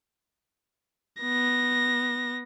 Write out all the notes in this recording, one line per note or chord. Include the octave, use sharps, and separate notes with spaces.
B3 A#6